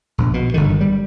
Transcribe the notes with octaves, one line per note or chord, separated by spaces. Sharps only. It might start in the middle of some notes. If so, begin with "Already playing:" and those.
A#1
B2
G1 D3 D#3
G3